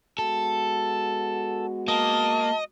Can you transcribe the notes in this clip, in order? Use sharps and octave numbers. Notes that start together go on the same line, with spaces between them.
G#3 B3 F#4 A4
A#3 D#5 A5